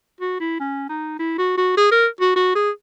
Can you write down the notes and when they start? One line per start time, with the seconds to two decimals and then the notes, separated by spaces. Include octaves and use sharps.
0.21 F#4
0.40 E4
0.60 C#4
0.89 D#4
1.19 E4
1.38 F#4
1.58 F#4
1.77 G#4
1.91 A#4
2.21 F#4
2.36 F#4
2.55 G#4